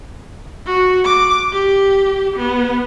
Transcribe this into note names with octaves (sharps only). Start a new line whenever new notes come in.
F#4
D6
G4
B3